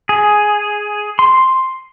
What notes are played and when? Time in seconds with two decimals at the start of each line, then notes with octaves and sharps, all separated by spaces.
0.09 G#4
1.19 C6